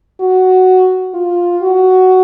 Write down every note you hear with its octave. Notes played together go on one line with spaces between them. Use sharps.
F#4
F4
F#4